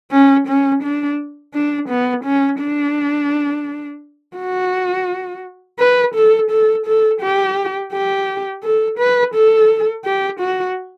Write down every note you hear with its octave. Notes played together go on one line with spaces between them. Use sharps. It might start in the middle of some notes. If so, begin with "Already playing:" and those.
C#4
C#4
D4
D4
B3
C#4
D4
F#4
B4
A4
A4
A4
G4
G4
A4
B4
A4
G4
F#4